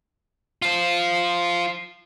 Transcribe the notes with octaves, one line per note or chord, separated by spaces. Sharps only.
F4 C5